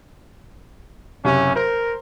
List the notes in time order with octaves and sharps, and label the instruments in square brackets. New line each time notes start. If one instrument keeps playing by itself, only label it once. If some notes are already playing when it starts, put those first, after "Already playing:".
[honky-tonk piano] F#1 C3 [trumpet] C#4
[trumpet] A#4 [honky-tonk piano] C5